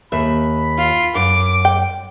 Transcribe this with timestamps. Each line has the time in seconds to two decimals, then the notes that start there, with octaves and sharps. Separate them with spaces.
0.12 D#2 E5 B5
0.78 F4
1.15 F#2 D6
1.65 G5